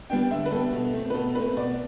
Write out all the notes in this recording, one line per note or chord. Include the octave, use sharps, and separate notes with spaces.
G3 B3 D4 G5
D3 E5
B4
G3 B3 D4 A4
B2
A3 C4
B4
B2 A4
A3 C4 B4
B2 D5